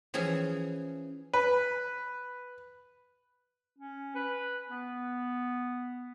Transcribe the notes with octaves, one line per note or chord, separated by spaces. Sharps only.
E3 F3 C#4 G#4
B4
C#4
B4
B3